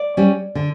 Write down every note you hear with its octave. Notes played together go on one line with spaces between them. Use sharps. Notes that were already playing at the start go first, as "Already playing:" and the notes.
Already playing: D5
G3 C#4
D3